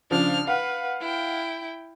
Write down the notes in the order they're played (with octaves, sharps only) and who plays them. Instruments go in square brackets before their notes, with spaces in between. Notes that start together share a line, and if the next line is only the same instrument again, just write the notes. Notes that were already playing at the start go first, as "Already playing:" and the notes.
[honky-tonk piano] C#3 F3 [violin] D4 F6
[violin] B4 [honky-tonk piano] F5 F#5
[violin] E4 G5